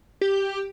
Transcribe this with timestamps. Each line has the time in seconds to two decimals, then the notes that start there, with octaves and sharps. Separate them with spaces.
0.21 G4